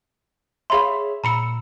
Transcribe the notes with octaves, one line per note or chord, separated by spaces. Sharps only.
G#4 C#5 E5 F5 B5 C6
A#2 A#5 B5 E6 C#7